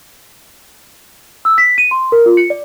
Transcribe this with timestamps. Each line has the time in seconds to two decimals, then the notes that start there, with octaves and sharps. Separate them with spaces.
1.45 E6
1.58 B6
1.78 D#7
1.91 C6
2.12 A#4
2.26 F4
2.37 C#7
2.50 D5